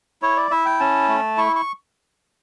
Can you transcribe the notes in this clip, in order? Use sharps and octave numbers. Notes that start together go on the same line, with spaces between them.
E4 C#5
D5
E4 E5
G5
C#4 A5
A3
E4 C#6
C#6